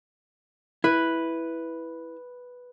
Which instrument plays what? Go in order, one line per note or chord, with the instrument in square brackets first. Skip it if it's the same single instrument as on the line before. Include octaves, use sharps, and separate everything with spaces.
[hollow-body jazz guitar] E4 [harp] B4